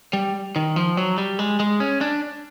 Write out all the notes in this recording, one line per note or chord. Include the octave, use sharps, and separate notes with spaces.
G3
D#3
F3
F#3
G3
G#3
G#3
C#4
D4